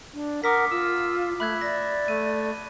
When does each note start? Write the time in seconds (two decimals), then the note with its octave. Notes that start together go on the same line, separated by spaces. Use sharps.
0.14 D4
0.44 A#4 F#5 D6 D#6 B6
0.71 F4 E6
1.40 A3 E5 B5 F#6 G#6
1.61 D5 A#6
2.08 A3 D#7